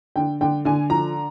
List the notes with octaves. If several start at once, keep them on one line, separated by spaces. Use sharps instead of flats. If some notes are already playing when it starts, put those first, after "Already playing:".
D3 G5
D3 G5
D3 G#5
F3 A#5